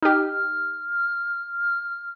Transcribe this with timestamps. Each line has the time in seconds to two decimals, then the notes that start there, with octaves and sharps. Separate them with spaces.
0.02 D#4 G4 F6